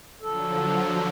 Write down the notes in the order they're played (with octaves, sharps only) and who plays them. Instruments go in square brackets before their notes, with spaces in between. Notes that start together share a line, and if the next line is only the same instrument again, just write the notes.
[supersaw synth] D3 F3 F#3 [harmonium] A4